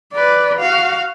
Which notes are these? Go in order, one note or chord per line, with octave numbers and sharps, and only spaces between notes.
B4 D5
F#4 F5